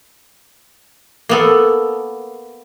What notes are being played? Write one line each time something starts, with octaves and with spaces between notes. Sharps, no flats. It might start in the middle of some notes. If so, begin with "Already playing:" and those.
A#3 B3 A4